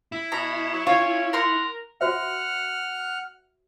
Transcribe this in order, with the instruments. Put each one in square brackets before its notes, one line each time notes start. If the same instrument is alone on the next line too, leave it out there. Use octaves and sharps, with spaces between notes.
[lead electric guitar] E4
[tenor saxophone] B2 [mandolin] A#5
[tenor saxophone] F#3
[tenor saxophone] C#4 [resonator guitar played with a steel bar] F4 [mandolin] C#5
[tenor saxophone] A#4 [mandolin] F#5 C6
[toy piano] F#4 C5 E5 [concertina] F#5 F6